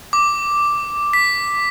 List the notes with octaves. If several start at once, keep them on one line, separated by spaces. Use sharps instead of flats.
D6
B6